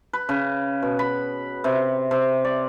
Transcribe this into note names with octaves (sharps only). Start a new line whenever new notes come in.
B4
C#3
B2
B5
C3
C3
D5